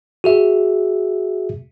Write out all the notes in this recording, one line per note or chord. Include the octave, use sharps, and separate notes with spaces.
F#4 G#4 E5